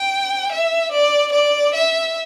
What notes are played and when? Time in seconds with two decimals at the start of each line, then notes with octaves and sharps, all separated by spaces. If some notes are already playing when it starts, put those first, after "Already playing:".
Already playing: G5
0.52 E5
0.92 D5
1.32 D5
1.74 E5